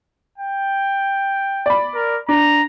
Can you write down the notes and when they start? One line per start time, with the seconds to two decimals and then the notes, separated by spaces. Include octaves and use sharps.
0.38 G5
1.66 D5 B5
1.95 A#4
2.29 D4 A#5